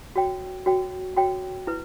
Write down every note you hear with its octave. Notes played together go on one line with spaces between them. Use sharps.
F#4 C#5 G5
F#4 C#5 G5
F#4 C#5 G5
E4 B4